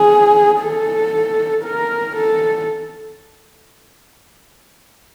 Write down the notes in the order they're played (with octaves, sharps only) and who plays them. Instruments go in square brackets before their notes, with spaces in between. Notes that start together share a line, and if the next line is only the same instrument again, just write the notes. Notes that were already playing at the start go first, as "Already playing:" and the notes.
Already playing: [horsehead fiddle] G#4
A4
A#4
A4